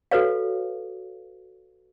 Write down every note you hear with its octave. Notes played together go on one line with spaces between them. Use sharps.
F#4 A4 B4 C#5 F5